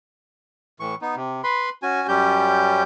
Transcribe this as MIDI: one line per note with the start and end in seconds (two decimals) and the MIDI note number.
0.80 0.95 45
0.80 0.95 52
0.80 0.95 85
1.02 1.15 59
1.02 1.15 63
1.16 1.42 48
1.44 1.70 71
1.44 1.70 83
1.44 1.70 84
1.83 2.07 61
1.83 2.07 66
1.83 2.07 80
2.08 2.83 42
2.08 2.83 55
2.08 2.83 61
2.08 2.83 67
2.08 2.83 91